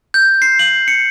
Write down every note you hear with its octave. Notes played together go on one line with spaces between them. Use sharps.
G6
C7
F#7
C#7